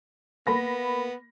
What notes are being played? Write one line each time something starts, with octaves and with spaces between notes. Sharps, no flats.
A#3 B3 B5 A#6